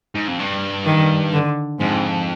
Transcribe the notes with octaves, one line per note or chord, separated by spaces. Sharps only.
G#2
F2
G2
D#3
D3
F2 G#2